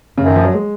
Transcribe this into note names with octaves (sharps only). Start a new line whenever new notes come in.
F#2 C#3
D#3
F3
F#3
G#3